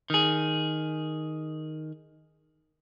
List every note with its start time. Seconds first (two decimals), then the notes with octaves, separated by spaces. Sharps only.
0.10 D#3 G#4